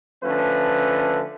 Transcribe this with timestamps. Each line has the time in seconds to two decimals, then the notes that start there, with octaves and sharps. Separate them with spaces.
0.24 D3 F3 A3 C#4 B4